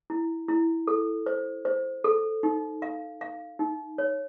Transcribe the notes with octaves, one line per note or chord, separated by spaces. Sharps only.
E4
E4
A4
C5
C5
A4
D#4
F5
F5
D#4
C#5